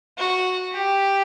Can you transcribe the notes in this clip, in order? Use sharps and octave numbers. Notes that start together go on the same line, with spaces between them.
F#4
G4